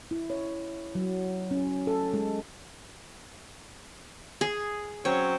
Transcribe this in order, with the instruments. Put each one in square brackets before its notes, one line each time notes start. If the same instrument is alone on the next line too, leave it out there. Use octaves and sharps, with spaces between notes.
[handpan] E4
C#5
F#3
C#4
A4
G#3
[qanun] G#4
[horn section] F#3 C4 C#4 [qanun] C#5